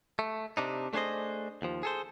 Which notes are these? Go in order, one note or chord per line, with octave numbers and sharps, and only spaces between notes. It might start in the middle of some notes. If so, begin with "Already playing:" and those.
A3
C3 D4 D#4
A3 D4 G#4 C5 D#5
D#2 F3
G#4 A4 C5